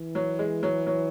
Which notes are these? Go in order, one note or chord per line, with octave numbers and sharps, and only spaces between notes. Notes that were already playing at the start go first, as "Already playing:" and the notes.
Already playing: E3
F#3
G#3
F#3
F#3